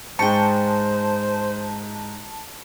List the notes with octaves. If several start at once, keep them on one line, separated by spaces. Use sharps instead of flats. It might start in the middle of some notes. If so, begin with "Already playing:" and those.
G#2 G#3 C5 G5 A5 C#6